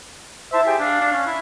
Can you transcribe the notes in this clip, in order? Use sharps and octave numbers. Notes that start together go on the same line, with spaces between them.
E4 C5 E5 A5
G4 G#4 G5
D4 F5
D4
C#4
E4